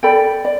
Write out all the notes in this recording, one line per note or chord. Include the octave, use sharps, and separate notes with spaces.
A4 D5 G5 B5
D5